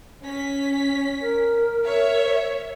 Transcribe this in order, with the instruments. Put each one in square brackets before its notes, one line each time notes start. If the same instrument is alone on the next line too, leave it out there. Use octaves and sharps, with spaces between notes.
[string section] C#4 B6
[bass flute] A#4
[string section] C#5 E5